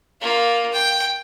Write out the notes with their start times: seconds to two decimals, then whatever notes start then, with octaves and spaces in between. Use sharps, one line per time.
0.21 A#3 F4
0.73 G5